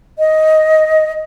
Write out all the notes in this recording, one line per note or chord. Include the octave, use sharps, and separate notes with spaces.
D#5